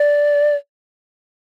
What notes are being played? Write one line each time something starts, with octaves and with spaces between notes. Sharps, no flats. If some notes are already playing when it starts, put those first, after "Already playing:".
Already playing: D5